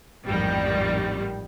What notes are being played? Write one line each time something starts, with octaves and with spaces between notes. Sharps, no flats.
A1 F2 G#2 D#3 G3